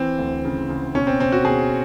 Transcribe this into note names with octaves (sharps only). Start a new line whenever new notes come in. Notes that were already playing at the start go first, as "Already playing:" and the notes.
Already playing: E3 C4
D2
C#3
C#3
B2 C#4
C4
B2 C4
F#4
B2 G#4